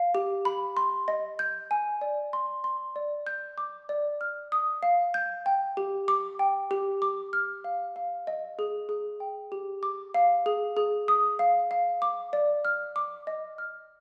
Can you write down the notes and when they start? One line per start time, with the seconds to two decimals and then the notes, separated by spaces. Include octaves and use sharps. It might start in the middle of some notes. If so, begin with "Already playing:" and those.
Already playing: F5
0.15 G4
0.45 B5
0.77 C6
1.08 D#5
1.39 G6
1.71 G#5
2.01 D5
2.33 C6
2.64 C6
2.96 D5
3.27 G6
3.58 D6
3.89 D5
4.21 F6
4.52 D#6
4.83 F5
5.14 G6
5.46 G5
5.77 G4
6.08 D6
6.39 G5
6.71 G4
7.02 D6
7.33 F6
7.64 F5
7.96 F5
8.27 D#5
8.59 G#4
8.89 G#4
9.20 G5
9.52 G4
9.83 D6
10.14 F5
10.46 G#4
10.77 G#4
11.08 D#6
11.39 F5
11.71 F5
12.02 D6
12.33 D5
12.65 F6
12.96 D6
13.27 D#5
13.58 F6